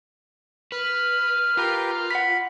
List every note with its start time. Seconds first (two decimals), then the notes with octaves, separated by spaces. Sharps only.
0.72 B4 F6
1.57 F4 G4 A#4 B4
2.11 F#5 B5 B6